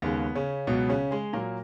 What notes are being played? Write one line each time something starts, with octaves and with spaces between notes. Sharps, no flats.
D#2 C#3 G#3 B3
C#3 C#4
C#2 B2 F#3 B3
C#3 C#4
G#3 G#4
A#2 F#3 A#3 A#4